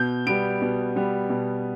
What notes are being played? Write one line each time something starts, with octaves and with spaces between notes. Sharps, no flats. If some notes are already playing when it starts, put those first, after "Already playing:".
Already playing: B2 G6
G3 B3 D7
B2
G3 B3
B2